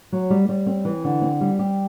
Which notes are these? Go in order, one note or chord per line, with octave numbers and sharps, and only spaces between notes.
F#3
G3
G3
C4
E3
D3
C4
G3
G4